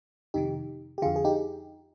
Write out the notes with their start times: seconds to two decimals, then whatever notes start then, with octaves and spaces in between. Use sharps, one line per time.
0.34 F2 C3 D#3 D#4 G4
0.98 G4
1.02 D3 F4 G#4
1.06 F2
1.16 G#4
1.25 D#4 G4